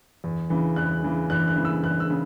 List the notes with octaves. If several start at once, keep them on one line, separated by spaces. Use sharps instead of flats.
E2
C#3 E3
E2 F#6
C#3 E3
E2 F#6
F#6
C#3 E3
E6
E2 F#6
E6
C#3